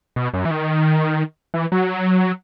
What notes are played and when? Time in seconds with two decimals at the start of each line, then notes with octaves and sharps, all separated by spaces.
0.16 B2
0.33 F#2
0.45 E3
0.51 D#3
1.54 E3
1.72 F#3